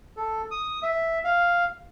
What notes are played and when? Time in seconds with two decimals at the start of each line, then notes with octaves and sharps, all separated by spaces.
0.17 A4
0.51 D#6
0.83 E5
1.25 F5